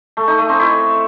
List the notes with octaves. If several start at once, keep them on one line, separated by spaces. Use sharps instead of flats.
A3
D#4
A3
C4
E4